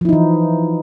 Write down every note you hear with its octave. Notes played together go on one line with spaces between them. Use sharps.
E3 F3 D#4 E4